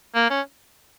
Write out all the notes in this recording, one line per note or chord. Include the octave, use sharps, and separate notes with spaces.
A#3
C#4